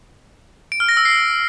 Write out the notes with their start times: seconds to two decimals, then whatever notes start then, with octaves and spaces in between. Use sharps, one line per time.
0.72 D7
0.80 F6
0.89 A#6
0.97 E6
1.05 C7